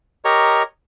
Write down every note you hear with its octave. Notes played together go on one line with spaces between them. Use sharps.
G4 A#4 C#5 D#5 A#5 C#6